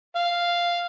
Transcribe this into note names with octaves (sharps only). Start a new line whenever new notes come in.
F5